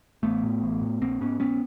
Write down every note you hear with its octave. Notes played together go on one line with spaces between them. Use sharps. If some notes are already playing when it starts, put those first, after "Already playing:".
A1 A3 B3
A2
A1
A2
A#1 A#3 C4
G#2 B3 C#4
A#1 B3 C#4